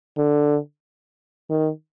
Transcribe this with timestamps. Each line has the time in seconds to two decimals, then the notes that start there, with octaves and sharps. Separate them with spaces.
0.17 D3
1.50 D#3